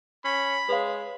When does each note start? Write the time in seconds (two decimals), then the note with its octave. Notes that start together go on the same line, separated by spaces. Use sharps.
0.25 C#4 B5
0.69 G#3 B4 C#5 F5